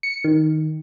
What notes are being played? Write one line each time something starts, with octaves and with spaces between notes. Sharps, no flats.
C#7
D#3